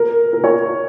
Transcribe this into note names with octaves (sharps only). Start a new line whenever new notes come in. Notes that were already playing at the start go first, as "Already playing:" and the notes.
Already playing: A#4
A#4
C#5